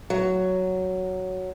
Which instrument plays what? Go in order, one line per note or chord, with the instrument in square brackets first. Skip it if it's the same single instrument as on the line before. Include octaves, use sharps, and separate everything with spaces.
[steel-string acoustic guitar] F#3